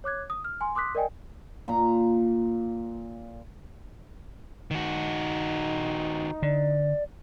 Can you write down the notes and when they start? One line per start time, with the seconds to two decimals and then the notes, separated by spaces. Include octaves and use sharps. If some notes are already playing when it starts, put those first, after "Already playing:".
0.04 C#5 D6 F#6 G#6
0.30 D#6
0.44 F6
0.61 G#5 C6
0.75 C6 D6 D#6 F#6 B6
0.95 A#4 D5 D#5 G5 G#5
1.68 A#2 A#5
4.71 D#3 D#4 F#4
6.42 D3 D5